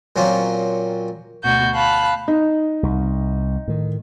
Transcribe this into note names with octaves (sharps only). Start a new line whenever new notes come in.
A#2 F#3 A#3 C4 C#4 F4
D2 B2 F#4 G6
F5 A5 B5 F#6
D#4
C2
A2 D#3